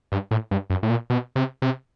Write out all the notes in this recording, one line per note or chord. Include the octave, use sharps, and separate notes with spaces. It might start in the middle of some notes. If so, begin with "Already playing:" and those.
G2
A2
G2
F#2
A2
A#2
B2
C3
C3